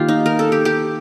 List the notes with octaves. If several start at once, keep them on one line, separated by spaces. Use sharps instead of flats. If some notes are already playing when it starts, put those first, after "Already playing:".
Already playing: D#3 A#3 F4 G4
D#4
A#4
A4
G4
G4